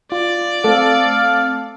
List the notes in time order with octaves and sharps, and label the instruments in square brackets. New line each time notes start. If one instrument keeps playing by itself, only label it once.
[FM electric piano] F4 [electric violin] D5
[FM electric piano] A3 C4 [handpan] A4 [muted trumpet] F5